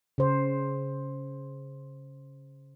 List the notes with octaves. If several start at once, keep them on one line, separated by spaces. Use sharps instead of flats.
C#3 C5